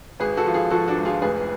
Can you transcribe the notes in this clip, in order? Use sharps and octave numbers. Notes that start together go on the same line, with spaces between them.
G#1 G#4 B4
F#4 A4
F3
F4 G#4
F3 F#4 A4
D4 F#4
G#1
F4 G#4
F1 G#4 B4